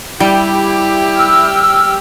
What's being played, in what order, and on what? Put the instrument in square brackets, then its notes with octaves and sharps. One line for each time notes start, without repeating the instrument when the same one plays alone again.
[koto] G3 [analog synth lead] E4 [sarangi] G4
[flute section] E6 F6